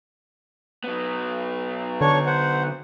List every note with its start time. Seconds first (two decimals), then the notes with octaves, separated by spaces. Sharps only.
0.84 F#3 B3
2.01 D3 D4 C#5 C#6
2.26 C5 F#5